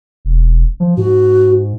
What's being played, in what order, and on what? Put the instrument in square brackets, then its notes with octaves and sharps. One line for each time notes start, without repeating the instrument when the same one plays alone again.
[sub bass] E1
F3
[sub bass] G#2 [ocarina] F#4